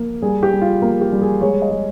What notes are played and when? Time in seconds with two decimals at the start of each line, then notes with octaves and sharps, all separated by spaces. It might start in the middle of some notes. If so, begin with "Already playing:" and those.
Already playing: A#3
0.22 G3 G#4
0.43 G4
0.53 G3
0.61 F4
0.82 A#3
1.01 G4
1.12 G3
1.22 G#4
1.41 G#3 C#5
1.62 D#5
1.71 G#3